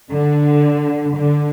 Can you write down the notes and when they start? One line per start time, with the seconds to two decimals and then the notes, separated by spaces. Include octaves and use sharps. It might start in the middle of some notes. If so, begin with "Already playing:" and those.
0.11 D3
1.15 D3